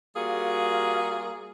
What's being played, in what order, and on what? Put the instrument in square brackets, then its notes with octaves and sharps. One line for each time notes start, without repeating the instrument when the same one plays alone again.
[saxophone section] G3 A#3 F4 F#4 G#4